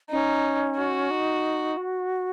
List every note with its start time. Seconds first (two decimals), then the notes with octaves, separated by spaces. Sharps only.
0.11 C#4 D#4
0.78 F#4
1.11 D#4
1.77 F#4